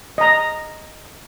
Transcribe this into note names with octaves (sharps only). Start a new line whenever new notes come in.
D#5 A#5